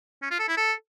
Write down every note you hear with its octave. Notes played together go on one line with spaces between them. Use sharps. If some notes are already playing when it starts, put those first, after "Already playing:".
C#4
F4
A4
E4
A4